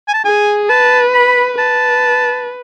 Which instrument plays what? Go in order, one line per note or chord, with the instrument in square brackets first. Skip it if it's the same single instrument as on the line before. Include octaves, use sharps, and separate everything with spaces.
[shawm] G#5
A5
[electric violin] G#4 [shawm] G#5
[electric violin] B4 [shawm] A5
[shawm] B5
[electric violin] B4 [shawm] A5